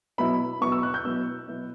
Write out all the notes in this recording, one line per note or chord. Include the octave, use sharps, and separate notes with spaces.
B2 F#3 B3 E4 B5
B2 F#3 B3 E4 C#6
E6
F#6
G6
B2 F#3 B3 E4 E6
B2 F#3 B3 E4